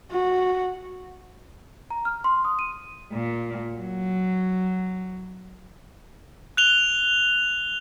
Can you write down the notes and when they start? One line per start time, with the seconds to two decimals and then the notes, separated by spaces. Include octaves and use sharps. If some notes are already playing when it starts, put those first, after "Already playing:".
0.11 F#4
1.90 A#5
2.05 F6
2.24 C6
2.45 D#6
2.59 D#7
3.13 A#2
3.77 F#3
6.57 F#6 F7 G7